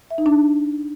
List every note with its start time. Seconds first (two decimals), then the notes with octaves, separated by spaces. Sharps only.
0.11 E5
0.18 D#4
0.26 D4